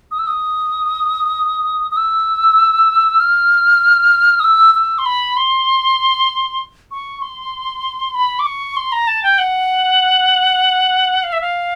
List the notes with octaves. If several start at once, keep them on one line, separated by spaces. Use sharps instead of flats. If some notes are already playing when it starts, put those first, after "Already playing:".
D#6
E6
D#6
D#6
E6
F6
D#6
E6
E6
C6
B5
C6
C#6
C6
B5
D6
C#6
C6
A#5
A5
G5
F#5
F5
E5
F5